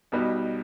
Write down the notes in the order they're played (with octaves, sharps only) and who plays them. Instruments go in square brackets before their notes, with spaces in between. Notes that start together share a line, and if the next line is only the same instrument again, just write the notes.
[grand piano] B1 B2 G3 B3 D#4